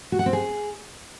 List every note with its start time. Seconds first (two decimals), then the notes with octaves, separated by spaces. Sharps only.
0.12 F#4
0.19 F#5
0.26 C4
0.33 G#4